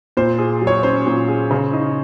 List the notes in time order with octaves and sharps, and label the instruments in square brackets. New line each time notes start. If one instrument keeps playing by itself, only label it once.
[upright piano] A#2 [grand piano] C5
[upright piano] G#4
F#3
[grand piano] C#5
[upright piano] C#4 [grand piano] C5
[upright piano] A#2
G#4
C#3
D#4